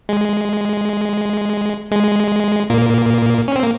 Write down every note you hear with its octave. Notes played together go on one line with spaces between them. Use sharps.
G#3
G#3
A#2 A#3
C#4
C4
A#3